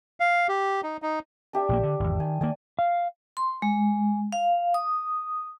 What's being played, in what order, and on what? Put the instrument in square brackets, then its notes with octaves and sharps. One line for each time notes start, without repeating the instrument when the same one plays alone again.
[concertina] F5
G4
D#4
D#4
[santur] D4 G4 E5
[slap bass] A#1 C#3 A#3
D3
G#1 E2
[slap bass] D#3 [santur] G#5
[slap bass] D#3 A#3 [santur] D5 G#5
[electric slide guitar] F5
[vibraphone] C6
G#3
F5
D#6